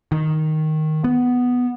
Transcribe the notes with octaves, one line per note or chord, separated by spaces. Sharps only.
D#3
B3